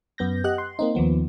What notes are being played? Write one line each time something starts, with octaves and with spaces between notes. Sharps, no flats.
F#2 B3 G6 A#6
G4 D#5 F#5 F#6
C6
A#3 C4 D#4
D#2 D#3 F3 B3